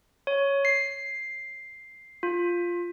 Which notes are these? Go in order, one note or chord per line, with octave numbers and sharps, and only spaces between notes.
C#5
C7
F4